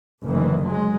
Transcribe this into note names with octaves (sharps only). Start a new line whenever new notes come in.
F#1 D2 D#3 E3
F#3 G#3